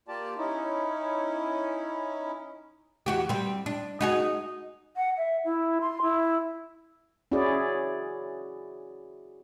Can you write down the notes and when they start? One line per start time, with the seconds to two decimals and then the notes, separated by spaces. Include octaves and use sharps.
0.08 A#3 F4 G4 D5 A5
0.38 C#4 D#4 E4
3.06 E2 F#4 G4
3.29 G3 C4
3.66 D4
4.01 D#4 F#4 G#4
4.96 F#5
5.17 E5
5.45 E4
5.81 C6
6.02 E4
7.32 C#4 E4 F#4 G#4 D5